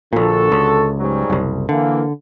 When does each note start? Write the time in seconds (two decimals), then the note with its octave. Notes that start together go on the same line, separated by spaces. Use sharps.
0.13 A#1 A#2 D3 F#4 A4
0.52 C#2
0.99 G#2 F#3 G3
1.30 F#1 C2
1.69 D3 E3 A#3